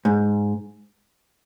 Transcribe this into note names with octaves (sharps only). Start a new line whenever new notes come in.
G#2